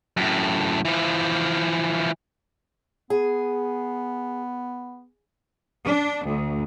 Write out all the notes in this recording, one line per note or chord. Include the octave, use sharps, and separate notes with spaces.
F#2 A2
E3 F3
B3 G#4
D4
D2